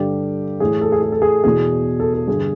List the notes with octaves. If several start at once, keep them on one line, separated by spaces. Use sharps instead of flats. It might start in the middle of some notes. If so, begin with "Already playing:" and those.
Already playing: G2 D3 G4
A2 E3 G#4
A4
G#4
G#4
A4
G#4
E2 B2 G#4
A4
A4
G2 D3 G#4